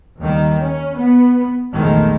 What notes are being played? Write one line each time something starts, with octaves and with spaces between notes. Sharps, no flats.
D#2 D#3 G3
C#4
B3
A#1 E2 D#3 G#3 A3